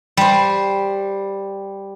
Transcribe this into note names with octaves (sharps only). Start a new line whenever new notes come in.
G3 C5